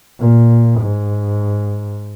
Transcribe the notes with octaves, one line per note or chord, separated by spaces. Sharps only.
A#2
G#2